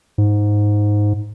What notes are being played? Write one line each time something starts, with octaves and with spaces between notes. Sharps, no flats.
G#2